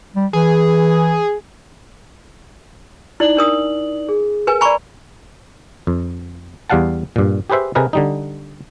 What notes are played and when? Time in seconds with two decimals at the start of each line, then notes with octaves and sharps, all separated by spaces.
0.15 G3
0.33 E3 G#4
3.20 D#4 E4 D5 F#7
3.37 D4 A#4 D#6
4.09 G#4
4.47 A#4 B4 G#5
4.61 D5 G#5 A#5 B5 C#6
5.87 F2
6.70 E2 G3 F5 F#5 A5
7.16 G2 A#2
7.50 G4 G#4 B4 C5 E5
7.75 C3 G#4 A#4 B4 D#5
7.93 D3 G3 D#4